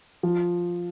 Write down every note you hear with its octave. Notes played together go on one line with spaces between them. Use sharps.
F3